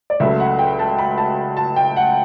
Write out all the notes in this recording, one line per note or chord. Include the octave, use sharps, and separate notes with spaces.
D5
C#2 C#3 F#3 A3 E5
F#5
G5
A5
B5
A5
A5
G5
F#5